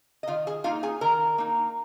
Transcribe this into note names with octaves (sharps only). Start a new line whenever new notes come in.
D#5
D#3 F4 F5
G#4 G#5
A#3 D#4 F4 F5
G#4 G#5
D#3 A#4 A#5
A#3 D#4